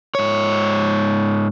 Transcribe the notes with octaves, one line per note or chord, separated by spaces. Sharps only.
G#2 C#5